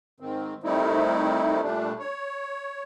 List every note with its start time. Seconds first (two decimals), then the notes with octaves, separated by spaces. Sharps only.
0.20 G#2 D#3 C4
0.64 D#3 G3 A3 C4 D#4 E4
1.63 A#2 G3 A3 D4
1.99 C#5